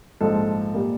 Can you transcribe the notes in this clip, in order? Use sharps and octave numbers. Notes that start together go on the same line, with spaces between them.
A#1 G#2 F3 A4
A#2 G3 A#3